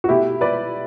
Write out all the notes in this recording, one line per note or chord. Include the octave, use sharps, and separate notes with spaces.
F#4
B2 A3 E4 G4
B4 D5